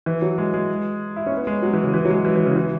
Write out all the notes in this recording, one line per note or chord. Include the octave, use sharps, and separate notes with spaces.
E3
F#3
G#3
G#3
E4
C#4
B3
G#3
F#3
E3
C#3
E3
F#3
G#3
E3
E3
C#3
E3